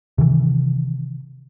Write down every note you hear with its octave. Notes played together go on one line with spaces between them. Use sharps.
C3 D#3 E3